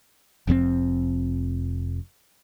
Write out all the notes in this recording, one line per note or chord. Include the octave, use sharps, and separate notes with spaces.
F1 F2 A#2 C4